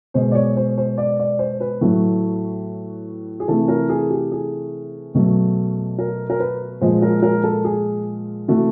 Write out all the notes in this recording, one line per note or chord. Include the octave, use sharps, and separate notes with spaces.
B2 G#3 C5
D5
C#5
C5
C5
D5
D5
C5
B4
A2 F#3 A3
G#4
C3 E3 A3 A4
A#4
G#4
G4
G#4
B2 F#3 A3
A#4
A#4
B4
A#2 F3 G#3 C5
A#4
A#4
A4
G#4
C3 E3 A3 F#4